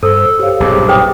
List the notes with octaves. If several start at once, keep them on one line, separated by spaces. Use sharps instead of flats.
G2 A4 C5 E6
G4 C5 C#5 F5
B1 G2 A#2 G#4 C5 D6
B4 G5 D#6